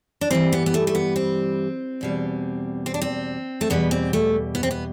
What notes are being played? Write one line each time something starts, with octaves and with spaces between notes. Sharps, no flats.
D4
G2 E3 G3 C4
B3
B3
A3
A3
B3
C4
E2 B2 G3
C4
D4
C4
A3
E2 B2 G3 B3
C4
A3
B3
C4
B3